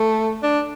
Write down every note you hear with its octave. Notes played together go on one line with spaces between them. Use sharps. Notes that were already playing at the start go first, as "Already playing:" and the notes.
Already playing: A3
D4